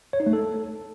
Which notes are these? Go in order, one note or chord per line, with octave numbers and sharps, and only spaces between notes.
C#5
D#4
A3
A4